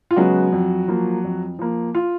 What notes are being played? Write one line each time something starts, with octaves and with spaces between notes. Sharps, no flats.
F4
C#3 F#3 G#3 B3 F#4
F2
F3 A#3
F2
F3 A#3
F4